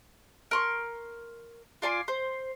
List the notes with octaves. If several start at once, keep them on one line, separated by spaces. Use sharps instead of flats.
A#4 C6 C#6
F4 D5 G#5 C6
C5